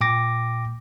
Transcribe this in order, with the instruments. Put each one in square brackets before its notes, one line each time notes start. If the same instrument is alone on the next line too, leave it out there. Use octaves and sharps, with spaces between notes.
[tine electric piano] A#2 G5 D6 A#6